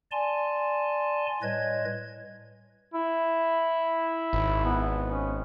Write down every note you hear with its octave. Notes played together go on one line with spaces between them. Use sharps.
D5 G#5 A5 C6
A2 G3 B4 C#5 D#5 G#6
E4
G#1
B3
C#4